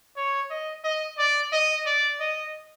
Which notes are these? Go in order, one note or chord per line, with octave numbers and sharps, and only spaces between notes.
C#5
D#5
D#5
D5
D#5
D5
D#5